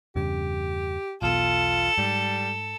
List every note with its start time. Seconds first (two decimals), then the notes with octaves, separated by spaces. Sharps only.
0.16 E2 G2 C#3 G4
1.22 B1 E2 B2 F4 A4
1.98 G#2 G3